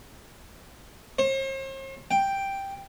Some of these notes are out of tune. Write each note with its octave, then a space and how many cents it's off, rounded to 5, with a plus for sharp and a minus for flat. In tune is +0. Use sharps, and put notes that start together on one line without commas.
C5 +45
G5 +0